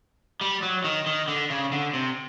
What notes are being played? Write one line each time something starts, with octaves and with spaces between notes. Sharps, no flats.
G3
F#3
D#3
D#3
D3
C#3
D3
C3